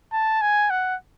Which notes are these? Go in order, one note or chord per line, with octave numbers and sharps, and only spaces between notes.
A5
G#5
F#5